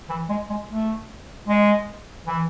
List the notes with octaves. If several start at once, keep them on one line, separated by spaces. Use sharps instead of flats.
E3
G#3
G#3
A3
G#3
E3